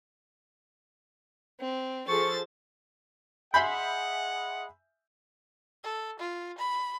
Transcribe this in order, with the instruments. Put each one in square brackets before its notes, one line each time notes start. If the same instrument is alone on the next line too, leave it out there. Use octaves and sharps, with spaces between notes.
[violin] C4
[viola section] F3 G#4 A4 [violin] C5 A6 [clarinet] C#6
[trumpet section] G#4 D#5 F#5 [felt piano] E5 G#5 G6 [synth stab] B5 C6
[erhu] A4
F4
B5